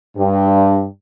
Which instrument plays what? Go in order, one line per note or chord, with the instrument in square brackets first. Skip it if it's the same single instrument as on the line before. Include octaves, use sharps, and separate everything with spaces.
[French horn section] G2